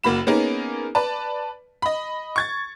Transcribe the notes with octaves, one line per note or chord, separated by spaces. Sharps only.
F#1 A#3 F#4 B5 E7
A#3 B3 C#4 D#4 G#4 A#4
B4 D5 A5
D#5 B5
C#6 G#6 A6